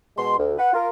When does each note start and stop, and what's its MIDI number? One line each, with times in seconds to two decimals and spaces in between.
0.17 0.37 47
0.17 0.37 56
0.17 0.37 84
0.38 0.53 38
0.57 0.72 71
0.57 0.72 78
0.73 0.89 65
0.73 0.89 70